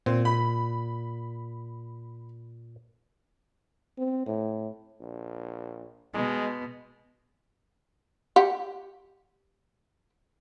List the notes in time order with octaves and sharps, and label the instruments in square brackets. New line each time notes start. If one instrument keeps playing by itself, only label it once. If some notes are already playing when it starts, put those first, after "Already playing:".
[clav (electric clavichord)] A#2 [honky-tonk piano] C4
[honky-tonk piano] B5
[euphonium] C4
A2
[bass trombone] A#1
[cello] B2 [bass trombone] G#3
[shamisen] G4 F#5